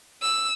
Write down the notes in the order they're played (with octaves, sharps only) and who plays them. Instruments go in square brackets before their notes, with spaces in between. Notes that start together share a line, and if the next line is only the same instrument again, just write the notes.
[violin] E6